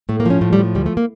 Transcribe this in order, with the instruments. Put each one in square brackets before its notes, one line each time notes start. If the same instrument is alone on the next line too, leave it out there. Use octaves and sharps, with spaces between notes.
[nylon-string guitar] A2 A3
A#3
F3 C#4
A2 A3
G3
F3
D2 G3
A3
A#3